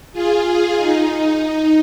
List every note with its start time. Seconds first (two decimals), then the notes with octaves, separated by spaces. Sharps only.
0.13 F4 G#4
0.44 F4 G#4
0.76 D#4
1.40 D#4